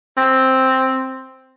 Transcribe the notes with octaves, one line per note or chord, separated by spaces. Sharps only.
C4